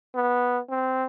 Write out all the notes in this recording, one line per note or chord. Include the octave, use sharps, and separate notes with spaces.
B3
C4